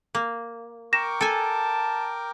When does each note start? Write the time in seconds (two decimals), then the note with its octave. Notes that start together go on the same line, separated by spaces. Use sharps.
0.15 A#3
0.93 A#4 G5 C#6 D6 A#6 E7
1.21 A4 G#5 A5